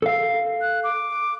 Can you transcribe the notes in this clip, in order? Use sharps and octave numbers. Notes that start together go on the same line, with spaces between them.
A4 F5
F#6
D6